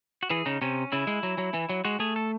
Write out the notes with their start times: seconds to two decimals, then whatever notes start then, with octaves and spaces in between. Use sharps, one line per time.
0.23 F#4
0.30 E3 G#4
0.46 C#3 D#4
0.61 C3 C#4
0.92 C#3 E4
1.07 G#3
1.23 F#3
1.38 F#3
1.54 E3
1.69 F#3
1.85 G#3 F#4
2.00 A3 G#4
2.16 A4